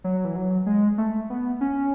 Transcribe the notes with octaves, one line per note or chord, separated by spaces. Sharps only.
F#3
E3
F#3
G#3
A3
B3
C#4